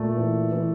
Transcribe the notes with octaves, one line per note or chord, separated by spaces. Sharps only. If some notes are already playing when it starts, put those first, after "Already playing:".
Already playing: A#2 A3
E3
E3